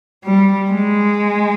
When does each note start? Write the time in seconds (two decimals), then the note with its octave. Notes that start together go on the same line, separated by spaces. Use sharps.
0.25 G3
0.71 G#3